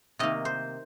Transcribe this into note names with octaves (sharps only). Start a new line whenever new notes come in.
C3 D#3 A#3 D#5
C5